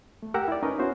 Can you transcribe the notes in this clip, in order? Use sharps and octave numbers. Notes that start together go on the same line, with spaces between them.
A3
G4 A#4 F#5 G5 A#5 E6
E4 D5
C#4 D#4 A#4 B4 C#5 D#5
B3 C#4 E4 F#4 C5